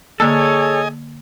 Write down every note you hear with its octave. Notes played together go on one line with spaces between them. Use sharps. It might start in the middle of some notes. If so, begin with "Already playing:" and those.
D3 A#3 G#4 A4 C#5 D#5 G#5 E6